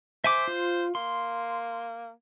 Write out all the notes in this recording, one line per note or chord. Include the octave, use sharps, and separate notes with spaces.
C5 E5 G#5 D6
F4
A#3 C6